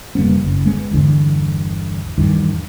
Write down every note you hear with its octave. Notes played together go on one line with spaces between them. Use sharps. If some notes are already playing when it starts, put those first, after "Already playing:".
F1 G3 A#3 B3
F#1
G#3 B3
G1 E2 D3
E2 G2 D#3